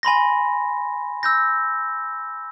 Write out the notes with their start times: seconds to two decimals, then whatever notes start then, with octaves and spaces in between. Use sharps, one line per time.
0.03 G#5 B5 C6 A#6
1.23 E6 G6 A#6